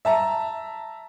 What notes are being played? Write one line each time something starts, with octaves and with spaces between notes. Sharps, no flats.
E5 A5 A#5